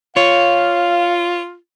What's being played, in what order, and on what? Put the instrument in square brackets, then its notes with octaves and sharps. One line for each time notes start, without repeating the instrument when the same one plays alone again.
[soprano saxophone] F4 [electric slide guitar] C#5 [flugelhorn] F5